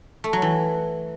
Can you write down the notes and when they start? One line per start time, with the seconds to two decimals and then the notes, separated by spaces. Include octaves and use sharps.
0.24 A3
0.33 F#3
0.42 E3